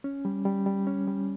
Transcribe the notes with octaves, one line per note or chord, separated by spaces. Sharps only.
C#4
G3
G3
G3
C#4
G3